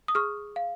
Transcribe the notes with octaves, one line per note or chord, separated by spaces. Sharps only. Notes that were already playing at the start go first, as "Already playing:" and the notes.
D#6
G#4 C#6 F6
F5